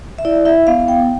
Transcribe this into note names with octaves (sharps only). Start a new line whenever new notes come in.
E5
E4 D5
E4 E5
B3 F5
F5
B3 G5